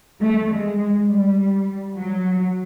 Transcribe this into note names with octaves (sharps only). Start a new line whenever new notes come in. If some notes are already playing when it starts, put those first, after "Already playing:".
A3
G#3
G3
F#3